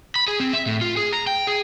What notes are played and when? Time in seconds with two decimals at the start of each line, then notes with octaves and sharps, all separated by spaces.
0.16 B5
0.28 G#4
0.40 C4
0.53 E5
0.67 A2
0.81 F4
0.97 G#4
1.13 A#5
1.27 G5
1.47 G#4